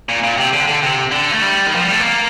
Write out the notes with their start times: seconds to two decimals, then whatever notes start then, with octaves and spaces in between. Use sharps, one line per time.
0.09 A#2
0.23 A#2
0.38 C3
0.53 D3
0.68 D3
0.82 C3
1.11 D3
1.32 A3
1.42 G3
1.66 D#3
1.75 F3
1.83 G3
1.92 A3
2.00 A#3